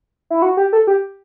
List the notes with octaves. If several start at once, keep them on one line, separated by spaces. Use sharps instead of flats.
E4
F#4
G4
A4
G4